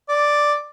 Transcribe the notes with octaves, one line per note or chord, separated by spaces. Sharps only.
D5